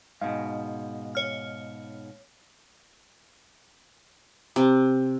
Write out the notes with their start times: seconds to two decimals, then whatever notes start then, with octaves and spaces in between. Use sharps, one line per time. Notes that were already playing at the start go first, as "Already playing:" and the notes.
0.21 G#2 B2 F5
1.15 C#5 F6
4.56 C3